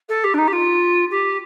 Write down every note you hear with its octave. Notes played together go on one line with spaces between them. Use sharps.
A4
G4
D4
D#4
G4
F4
G4